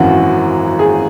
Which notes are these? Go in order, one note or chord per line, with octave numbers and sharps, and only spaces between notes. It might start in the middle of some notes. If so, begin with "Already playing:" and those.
Already playing: G#1 F#2 E3 F#4
G#4